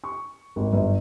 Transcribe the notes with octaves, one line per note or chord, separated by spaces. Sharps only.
C#6
G#1
G1